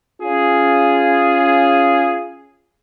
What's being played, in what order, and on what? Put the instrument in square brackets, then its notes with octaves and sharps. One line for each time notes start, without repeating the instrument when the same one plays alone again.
[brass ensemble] C#4 F4 G#4